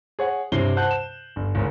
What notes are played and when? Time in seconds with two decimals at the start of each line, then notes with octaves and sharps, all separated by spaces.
0.19 G#4 C#5 F#5
0.52 G2 C3 C#4 E4 C7 G7
0.76 C5 F#5 A5 F#6 G6
0.91 E7
1.36 G1
1.55 G#1 G#2 C#3